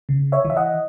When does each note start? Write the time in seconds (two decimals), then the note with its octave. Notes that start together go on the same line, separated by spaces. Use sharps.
0.09 C#3
0.32 C#5 E5
0.45 E3
0.50 E5
0.57 D#5 F#5